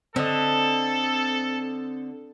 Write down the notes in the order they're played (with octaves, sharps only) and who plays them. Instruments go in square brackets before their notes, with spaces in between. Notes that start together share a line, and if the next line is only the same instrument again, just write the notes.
[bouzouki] D3 [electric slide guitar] C4 D#5 [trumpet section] A4